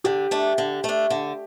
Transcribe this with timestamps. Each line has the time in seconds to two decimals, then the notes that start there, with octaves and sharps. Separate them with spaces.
0.04 D3 G4
0.31 A3 D4
0.58 D3
0.84 A3 D4
1.10 D3